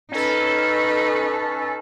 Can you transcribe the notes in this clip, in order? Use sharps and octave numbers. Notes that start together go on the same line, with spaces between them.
C#4 D#4 A4 B4